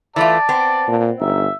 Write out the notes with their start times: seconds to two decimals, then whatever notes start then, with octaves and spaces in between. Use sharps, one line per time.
0.16 E3 A3 F4 D5 A5
0.49 B3 C4
0.88 A#2
1.20 G1 D#4 E5